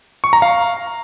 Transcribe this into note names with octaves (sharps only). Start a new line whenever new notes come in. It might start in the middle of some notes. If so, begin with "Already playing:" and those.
C#6
A#5
F5